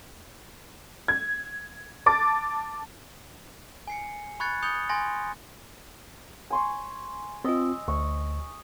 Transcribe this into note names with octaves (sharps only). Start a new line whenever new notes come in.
G#6
A5 D6 A6
G#5 C7 C#7
B5 C#6 F#6 G#6 A6 C#7
D#6 G6 A6 C#7 F7 G7
G#5 C6 A6 A#6
G#5 C6 C#6
C4 F4 D#5 E6
D2 C#6